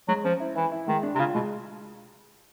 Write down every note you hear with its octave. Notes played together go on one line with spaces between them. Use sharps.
F#3 G#3
F3 C#4
E4
E3 E4
E4
D#3 G#3
D4
C3
C#3 F4
B2 G#3